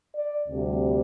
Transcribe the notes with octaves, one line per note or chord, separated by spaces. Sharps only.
D5
D2 C3 G3